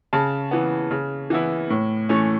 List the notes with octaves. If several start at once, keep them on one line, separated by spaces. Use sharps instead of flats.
C#3 A5
E3 B3
C#3
E3 B3 E4
A2
E3 A3 C#4